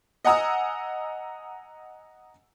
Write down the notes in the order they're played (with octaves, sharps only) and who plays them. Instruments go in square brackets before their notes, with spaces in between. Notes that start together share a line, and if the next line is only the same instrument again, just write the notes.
[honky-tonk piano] D#5 F#5 G#5 A#5 D#6 E6